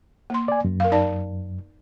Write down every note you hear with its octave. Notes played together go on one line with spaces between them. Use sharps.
A#3 C6
D5 G#5
F#2
A#4 F5
D#4 D5 A5